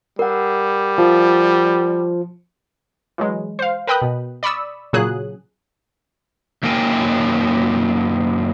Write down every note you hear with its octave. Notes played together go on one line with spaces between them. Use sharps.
G3 A#4 F#5
F3
E3 F#3 G#3
C5 F5
A#4 B4 G5 B5 D#6 F#6
B2
D5 B5 C#6 D#6 E6
A#2 C#3 F#3 G#4 D#6 F#6
F#2 A#3 D#4 A#4 G5 G#5